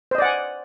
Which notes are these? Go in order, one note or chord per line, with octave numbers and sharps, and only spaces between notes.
C5 D5 D#5 F#5 G#5